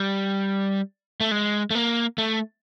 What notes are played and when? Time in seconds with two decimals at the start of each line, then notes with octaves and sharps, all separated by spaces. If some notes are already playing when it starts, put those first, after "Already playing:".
Already playing: G3
1.21 A3
1.31 G#3
1.70 A3
1.75 A#3
2.18 A3